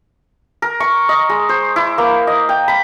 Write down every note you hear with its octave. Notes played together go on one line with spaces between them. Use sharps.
A#4
C#6
D#5
G#3
C5
E4
A#3
D#5
G5
B5